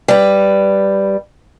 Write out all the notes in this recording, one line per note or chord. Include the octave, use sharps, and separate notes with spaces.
G3 B4